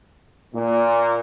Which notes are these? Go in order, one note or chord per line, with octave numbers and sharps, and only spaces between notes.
A#2